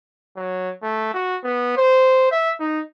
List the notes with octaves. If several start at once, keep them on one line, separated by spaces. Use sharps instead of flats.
F#3
A3
F#4
B3
C5
E5
D#4